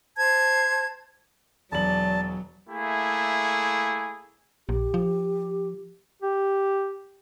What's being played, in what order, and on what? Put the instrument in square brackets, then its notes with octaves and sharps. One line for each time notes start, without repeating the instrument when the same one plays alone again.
[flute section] C5 A5 G#6
[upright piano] E1 F#7 [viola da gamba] F#3 [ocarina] D5 [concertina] A5
[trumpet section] A3 A#3 E4 G#4
[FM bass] A#1 [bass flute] G4
[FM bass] F3
[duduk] G4